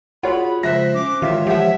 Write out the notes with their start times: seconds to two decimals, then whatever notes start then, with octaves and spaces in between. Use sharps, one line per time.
0.23 F4 F#4 G#4 C#5 F#5 B5
0.63 C#3 F3 G#3 C5 E5 F#6 A#6
0.94 C#4 D6
1.22 D#3 E3 G#3 F4 C#5 E5
1.47 F3 G4 E5 F#5